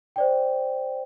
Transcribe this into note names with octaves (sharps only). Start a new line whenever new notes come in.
C5 D5 G5